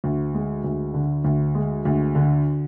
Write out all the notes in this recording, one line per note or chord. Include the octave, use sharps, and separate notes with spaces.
D2
G#3
D2
D3
D2
G#3
D2
D3